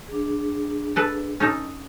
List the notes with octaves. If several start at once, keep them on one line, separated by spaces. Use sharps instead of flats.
D4 G#4
A4 B4 D5
C#4 D#4 A4